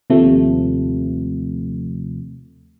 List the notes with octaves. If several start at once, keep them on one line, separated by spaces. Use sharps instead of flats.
D#2 C3 F3 A3